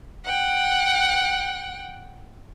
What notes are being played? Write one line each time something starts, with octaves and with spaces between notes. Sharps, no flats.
F#5 G5